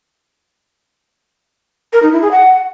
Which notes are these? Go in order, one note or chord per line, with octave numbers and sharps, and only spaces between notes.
A#4
D#4
E4
G#4
F#5